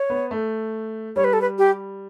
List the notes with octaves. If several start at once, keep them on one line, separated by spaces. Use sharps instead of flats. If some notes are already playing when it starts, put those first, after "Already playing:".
Already playing: C#5
B3
A3
G3 C#5
B4
A4
B4
G4